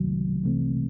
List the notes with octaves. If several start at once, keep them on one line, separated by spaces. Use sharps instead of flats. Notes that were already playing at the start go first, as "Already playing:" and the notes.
Already playing: C2 C3 D#3 F#3
C2 C3 E3 A3 C4